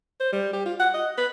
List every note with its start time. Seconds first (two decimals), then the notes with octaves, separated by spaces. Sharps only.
0.20 C5
0.33 G3
0.53 G4
0.66 F4
0.80 F#5
0.94 D#5
1.18 B4